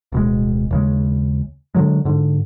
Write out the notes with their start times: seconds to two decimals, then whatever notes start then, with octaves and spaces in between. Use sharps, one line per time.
0.12 D1 B2 G#3
0.71 D#2 C#3 G#3
1.75 D3 F#3 G#3
2.05 G#2 D3